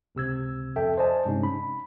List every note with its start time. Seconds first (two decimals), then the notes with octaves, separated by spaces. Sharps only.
0.15 C#2 C3 E6 G#6
0.76 F2 A4 E5 G5
0.97 C5 D5 D#5 G#5 A5
1.25 G2 C3 G#3 C#4 D#4
1.43 B5